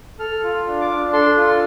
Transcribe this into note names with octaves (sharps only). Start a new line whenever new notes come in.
A4 F6
F4
D4
D6
D4
A4 C6
F4
C6